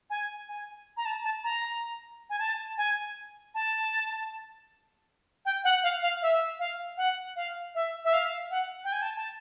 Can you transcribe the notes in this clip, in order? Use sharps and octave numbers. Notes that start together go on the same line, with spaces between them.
G#5
G#5
A#5
A5
A5
A#5
G#5
A5
G#5
A5
G5
F#5
F5
F5
E5
F5
F#5
F5
E5
E5
F5
F#5
G5
G#5
A5
A5